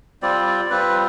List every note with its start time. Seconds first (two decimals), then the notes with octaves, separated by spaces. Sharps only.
0.22 G3 C4 F4 D5
0.47 D5
0.70 G3 C4 F4 B4